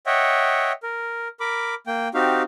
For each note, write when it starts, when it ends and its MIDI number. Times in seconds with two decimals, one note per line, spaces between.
0.06 0.72 73
0.06 0.72 75
0.06 0.72 76
0.06 0.72 78
0.06 0.72 79
0.83 1.28 70
1.40 1.75 70
1.40 1.75 83
1.40 1.75 86
1.87 2.08 58
1.87 2.08 79
2.14 2.43 60
2.14 2.43 63
2.14 2.43 66
2.14 2.43 67
2.14 2.43 77